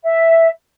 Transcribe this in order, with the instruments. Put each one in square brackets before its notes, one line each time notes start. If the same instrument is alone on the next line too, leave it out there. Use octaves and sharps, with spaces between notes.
[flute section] E5